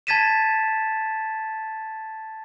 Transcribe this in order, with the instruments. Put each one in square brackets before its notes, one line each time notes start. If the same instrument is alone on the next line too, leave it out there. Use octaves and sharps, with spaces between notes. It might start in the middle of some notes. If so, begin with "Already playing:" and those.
[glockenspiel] A5 G#6 A6 B6 D#7 E7